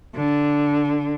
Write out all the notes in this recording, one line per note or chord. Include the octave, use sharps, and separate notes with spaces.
D3